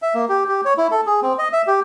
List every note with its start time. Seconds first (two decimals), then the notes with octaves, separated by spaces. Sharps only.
0.02 E5
0.14 A#3
0.29 G4
0.48 G4
0.65 C#5
0.78 E4
0.91 A4
1.06 G#4
1.22 C4
1.39 D#5
1.53 E5
1.67 G4